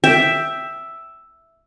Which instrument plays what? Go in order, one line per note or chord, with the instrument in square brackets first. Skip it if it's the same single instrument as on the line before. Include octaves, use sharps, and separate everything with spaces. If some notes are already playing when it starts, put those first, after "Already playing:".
[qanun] E5 [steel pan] G5